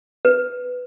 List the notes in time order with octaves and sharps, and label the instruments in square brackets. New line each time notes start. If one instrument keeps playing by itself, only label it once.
[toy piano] B4